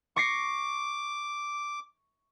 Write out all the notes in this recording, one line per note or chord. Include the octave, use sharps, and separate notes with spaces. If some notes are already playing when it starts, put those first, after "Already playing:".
C#6 D6 A#6 C7